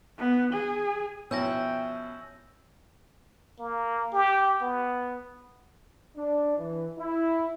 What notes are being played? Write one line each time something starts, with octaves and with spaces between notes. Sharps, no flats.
B3
G#4
B2 F3 C#4 E4 G5 E6 G6 A#6
A#3
G4
B3
D4
E3
E4